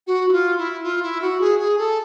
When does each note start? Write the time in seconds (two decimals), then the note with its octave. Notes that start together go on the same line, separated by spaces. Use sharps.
0.06 F#4
0.28 E4
0.32 F4
0.57 E4
0.83 F4
1.02 E4
1.21 F#4
1.40 G#4
1.59 G#4
1.77 A4